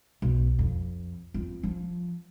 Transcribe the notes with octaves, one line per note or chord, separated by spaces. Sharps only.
B1
F2
F2
F3